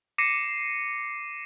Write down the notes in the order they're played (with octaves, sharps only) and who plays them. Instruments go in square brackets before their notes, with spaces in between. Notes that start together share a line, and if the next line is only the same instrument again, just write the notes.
[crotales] D6 A#6 C7 C#7 D#7 E7